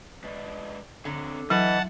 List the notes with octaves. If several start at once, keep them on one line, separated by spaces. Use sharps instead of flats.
G#3 B4 D5
D3 C4 C#5 A#5
E3 F#3 D#5 F#5 A5